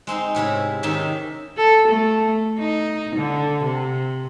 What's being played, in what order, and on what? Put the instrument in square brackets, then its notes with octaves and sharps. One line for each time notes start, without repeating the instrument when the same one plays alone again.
[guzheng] G#3 C4 D#4 C5
G#2 C3 C#4 E4
C3 D#3 C#4 D#4 G4 E5
[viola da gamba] A4
A3
D#4
D3
C3